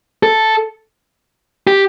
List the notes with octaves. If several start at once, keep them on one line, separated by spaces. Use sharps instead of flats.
A4
G4